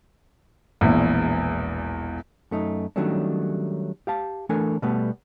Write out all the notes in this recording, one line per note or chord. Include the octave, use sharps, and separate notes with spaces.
E1 A#1 E2
F#2 A3 D#4
D#3 F#3 G3 A3 C#4 D4
G4 F5 A5
E3 A3 D4 A4 A#4 G#5
B2 G3 A3 B3